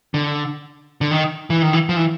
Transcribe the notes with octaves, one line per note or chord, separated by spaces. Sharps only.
D3
D3
D#3
E3
D#3
E3
F3
E3